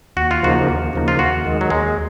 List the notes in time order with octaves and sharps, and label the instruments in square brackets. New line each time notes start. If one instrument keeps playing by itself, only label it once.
[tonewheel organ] D#2 [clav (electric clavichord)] F#4
[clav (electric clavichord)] F4
[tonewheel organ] C#3 F3 A#3 D#4 [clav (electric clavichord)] F#4
[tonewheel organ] D#2
C#3 F3 A#3 D#4
[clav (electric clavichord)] F4
[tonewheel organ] D#2 [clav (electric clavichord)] F#4
[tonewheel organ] D#3 G#3
[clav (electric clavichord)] F#3
[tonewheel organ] D#2 [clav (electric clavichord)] G#3